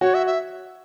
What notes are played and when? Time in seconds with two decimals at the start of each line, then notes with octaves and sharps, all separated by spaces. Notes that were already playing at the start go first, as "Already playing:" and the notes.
0.01 F#4 C#5
0.14 E5
0.27 E5